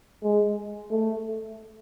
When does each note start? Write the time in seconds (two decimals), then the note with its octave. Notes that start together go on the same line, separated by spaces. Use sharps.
0.23 G#3
0.91 A3